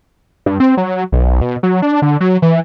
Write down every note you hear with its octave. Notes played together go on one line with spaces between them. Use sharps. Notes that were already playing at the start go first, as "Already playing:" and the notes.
G2
C4
F#3
B1
B2
F#3
D4
D3
F#3
E3